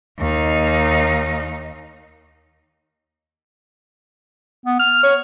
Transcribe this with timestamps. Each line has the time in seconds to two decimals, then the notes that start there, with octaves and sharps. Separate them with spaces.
0.19 D#2 D#4
4.66 B3
4.80 F6
5.03 C#5